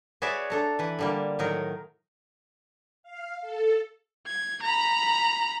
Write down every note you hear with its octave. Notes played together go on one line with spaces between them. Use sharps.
F#4 G#4 B4 C#5 D5 E5
D4 A4 A#5
E3 B4
D3 G3 A#3
A2 D#3 F#3 D#4 A#4
F5
A4
G#6
A#5 B5